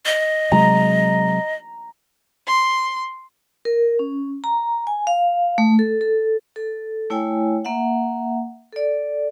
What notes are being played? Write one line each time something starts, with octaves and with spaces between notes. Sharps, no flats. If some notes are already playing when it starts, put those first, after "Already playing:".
D#5
C3 F#3 G#3 A#5
C6
A#4
C#4
A#5
G#5
F5
A3
A4
A4
A4
A3 E4 C#5 G5 G#5
A#3 E5 F#5
A4 D5